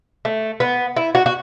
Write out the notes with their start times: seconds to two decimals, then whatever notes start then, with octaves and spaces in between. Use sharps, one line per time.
0.25 A3
0.60 B3
0.96 E4
1.15 F#4
1.26 F#4